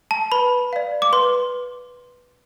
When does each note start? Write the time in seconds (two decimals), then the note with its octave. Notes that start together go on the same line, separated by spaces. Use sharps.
0.11 A5
0.32 B4 B5
0.73 D5 F5
1.02 D6
1.13 B4 C6